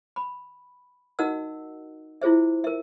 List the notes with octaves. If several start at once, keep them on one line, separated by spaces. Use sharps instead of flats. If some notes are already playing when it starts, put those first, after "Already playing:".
B5
D#4 F#4 A#4 D#5 F#5 E6
E4 F4 G#4 C5 E5
A#4 E5